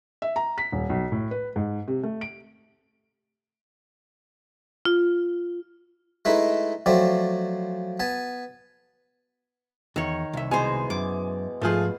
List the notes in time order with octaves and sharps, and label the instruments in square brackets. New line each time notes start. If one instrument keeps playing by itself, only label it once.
[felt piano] E5
A#5
B6
D#1
B1
A2
B4
G#2
C3
A3
D7
[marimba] F4
[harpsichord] G#3 A3 D#4 E4 B4
F3 F#3 A3 C4 D5
B3 G#5 A5
[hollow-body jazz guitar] E2 [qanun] D#3 C#5
[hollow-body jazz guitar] C2 E5
[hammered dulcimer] B2 E3 [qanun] G#3 D#4 C5 [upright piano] G#5
[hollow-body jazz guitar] F#2 [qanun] D6
[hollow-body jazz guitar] G#2 F3 [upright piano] A3 F4 G#4